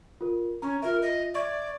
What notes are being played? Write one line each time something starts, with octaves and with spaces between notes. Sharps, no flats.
F4 A#4
C#4 A#5 C#6
F4 A#4 E5
D#5
D5 E5 C#6 G#6